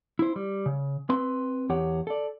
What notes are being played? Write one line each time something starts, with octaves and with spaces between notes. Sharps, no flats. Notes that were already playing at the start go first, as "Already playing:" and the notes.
E4 C5
G3
C#3
C4 B4 C6
E2 G4 C#5 F#5
A4 D5